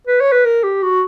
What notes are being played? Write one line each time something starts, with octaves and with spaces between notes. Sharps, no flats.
B4
C#5
B4
A#4
G4
F#4